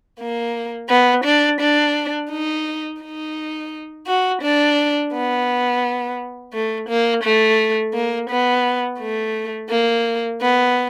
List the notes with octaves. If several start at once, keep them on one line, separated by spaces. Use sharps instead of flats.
A#3
B3
D4
D4
D#4
D#4
F#4
D4
B3
A3
A#3
A3
A#3
B3
A3
A#3
B3